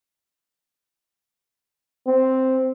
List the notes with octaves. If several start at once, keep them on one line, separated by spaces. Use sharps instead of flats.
C4